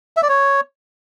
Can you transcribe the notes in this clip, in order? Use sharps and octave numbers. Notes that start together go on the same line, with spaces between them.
E5
D5
C#5